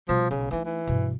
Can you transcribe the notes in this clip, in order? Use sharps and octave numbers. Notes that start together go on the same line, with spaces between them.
B2 F3 G3
B1 C#3
E3 A3 D#4
E3
G2 B2